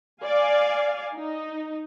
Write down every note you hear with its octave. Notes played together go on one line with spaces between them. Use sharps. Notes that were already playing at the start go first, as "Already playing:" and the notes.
D5 F5 G#5
D#4